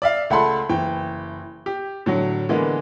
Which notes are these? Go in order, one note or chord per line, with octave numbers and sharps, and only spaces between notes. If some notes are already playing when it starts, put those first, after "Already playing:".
D5 E5 F5
C#2 A3 F#5 A5 B5 C6
F#1 E3 G5
G4
A2 D3 F#3
D3 E3 G#3 A#3 B3